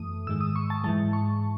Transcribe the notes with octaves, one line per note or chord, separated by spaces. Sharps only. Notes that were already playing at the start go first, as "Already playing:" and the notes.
Already playing: F#2 E3 A3 D#6
G#2 D#3 G#3 E6
D#6
C#6
A5
G#2 E3 G#3 A5
C#6